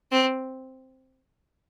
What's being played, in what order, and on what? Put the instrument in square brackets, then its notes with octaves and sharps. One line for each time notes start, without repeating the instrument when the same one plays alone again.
[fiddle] C4